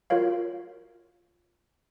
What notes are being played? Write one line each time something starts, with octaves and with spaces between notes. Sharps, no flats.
F4 F#4 A#4 C#5 F5